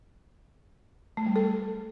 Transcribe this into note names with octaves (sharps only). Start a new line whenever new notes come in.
A3
G3
A4